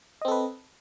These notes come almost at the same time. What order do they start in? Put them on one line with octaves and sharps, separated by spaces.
D#5 C4 A4 B4